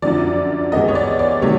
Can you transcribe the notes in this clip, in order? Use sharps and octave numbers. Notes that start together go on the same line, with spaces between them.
F#2 D3 F3 D5
G2 E3 G#3 B3 D#5
C#5
D5
D5
C3 D#3 F#3 A3 C#5